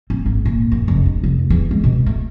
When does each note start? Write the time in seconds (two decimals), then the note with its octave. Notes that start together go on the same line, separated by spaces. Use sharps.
0.10 C4
0.25 G#1
0.45 A#2
0.72 F#2
0.88 F1
1.06 D4
1.23 F1
1.50 E2
1.71 G#3
1.84 B2
2.06 A3